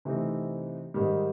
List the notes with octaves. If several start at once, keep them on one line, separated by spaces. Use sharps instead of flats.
C3 E3 A3 C4 D#4
G#2 D#3 G3